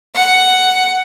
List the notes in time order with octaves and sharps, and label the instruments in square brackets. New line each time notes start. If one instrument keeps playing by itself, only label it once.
[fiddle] F#5